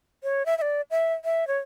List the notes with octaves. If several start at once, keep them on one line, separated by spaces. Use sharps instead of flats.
C#5
E5
E5
D5
E5
E5
C#5